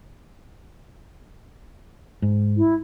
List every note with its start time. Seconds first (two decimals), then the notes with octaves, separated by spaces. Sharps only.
2.22 G#2
2.57 E4